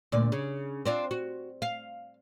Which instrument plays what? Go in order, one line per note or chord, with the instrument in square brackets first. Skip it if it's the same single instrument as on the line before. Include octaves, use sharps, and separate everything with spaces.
[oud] D2 A#2 D5
C#3
C4 D4 F4
F#4
F5